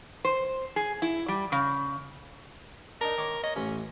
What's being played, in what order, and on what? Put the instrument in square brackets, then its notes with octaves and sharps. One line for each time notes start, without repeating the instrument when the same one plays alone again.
[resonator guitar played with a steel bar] C5
G#4
E4
G3
C#3
[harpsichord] D4 D#4 [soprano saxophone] A#4
[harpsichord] D#3 C#5 D6
[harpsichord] C#5 [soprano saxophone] D#5
[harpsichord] A1 [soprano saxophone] C#4